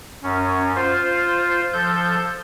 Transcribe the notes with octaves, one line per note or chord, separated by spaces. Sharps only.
F#2 C#4
F4 C5
F3 A4 G6